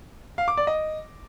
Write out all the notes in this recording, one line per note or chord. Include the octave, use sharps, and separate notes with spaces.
F5
D6
D5
D#5